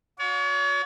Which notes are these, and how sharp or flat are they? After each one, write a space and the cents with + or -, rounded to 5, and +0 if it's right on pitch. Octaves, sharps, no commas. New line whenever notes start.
F#4 -45 C#5 +40